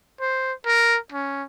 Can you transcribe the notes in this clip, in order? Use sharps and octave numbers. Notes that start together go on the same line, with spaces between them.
C5
A#4
C#4